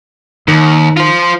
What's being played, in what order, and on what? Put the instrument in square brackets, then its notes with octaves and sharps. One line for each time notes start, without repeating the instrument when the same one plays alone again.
[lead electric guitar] D#2 [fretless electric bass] D#3
[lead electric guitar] F4 C5